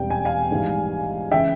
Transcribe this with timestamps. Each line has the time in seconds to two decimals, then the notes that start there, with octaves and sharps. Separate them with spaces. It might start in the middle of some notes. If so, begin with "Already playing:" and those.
Already playing: E1 E2 C3 G3 G5
0.10 G#5
0.25 F5 G#5
0.51 A#1 G#2 E3 G3
1.31 C#3 E3 G#3 E5 G5